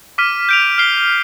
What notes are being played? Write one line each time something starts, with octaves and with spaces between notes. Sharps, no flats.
D6 F6 B6 D#7
G6 D7 F7
F6 C7 G7